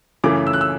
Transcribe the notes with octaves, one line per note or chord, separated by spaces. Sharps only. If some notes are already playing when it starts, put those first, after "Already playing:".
F#2 C#3 E3 A3 D6
E6
F#6
E6